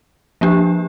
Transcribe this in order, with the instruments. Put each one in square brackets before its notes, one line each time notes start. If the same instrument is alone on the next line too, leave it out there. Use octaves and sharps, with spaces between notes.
[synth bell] F3 A#3 D4 G4